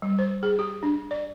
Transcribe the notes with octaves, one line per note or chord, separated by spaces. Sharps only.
G3
C5
G#4
G4
D4
D5